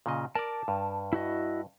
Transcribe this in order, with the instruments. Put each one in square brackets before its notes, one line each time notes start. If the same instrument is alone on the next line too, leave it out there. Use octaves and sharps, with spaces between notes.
[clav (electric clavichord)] A#2 C#3 D#5
[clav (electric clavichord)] A#4 D5 [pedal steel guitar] A5 D6
[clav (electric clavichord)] G2
[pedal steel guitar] E4 F#4 D#5